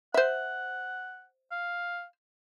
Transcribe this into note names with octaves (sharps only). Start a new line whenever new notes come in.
C5 E5 F#5
F5